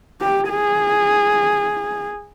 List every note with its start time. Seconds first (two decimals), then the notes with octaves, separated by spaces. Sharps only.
0.21 G4
0.49 G#4